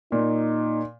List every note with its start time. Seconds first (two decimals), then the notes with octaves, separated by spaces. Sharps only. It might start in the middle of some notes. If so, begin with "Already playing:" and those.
0.12 A#2 D#4